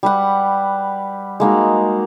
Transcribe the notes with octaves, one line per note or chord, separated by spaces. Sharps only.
G3 B4 F#5
G#3 A#3 D#4 F#4